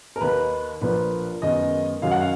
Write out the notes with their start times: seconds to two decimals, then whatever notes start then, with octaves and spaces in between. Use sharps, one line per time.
0.16 A#4
0.21 D#2 D#3 A#3 B4
0.81 A#1 A#2 F3 A#3 B4
1.42 F#2 D#3 G#3 B3 D#5
2.02 F#2 D#3 F#3 F5
2.11 F#5
2.21 F5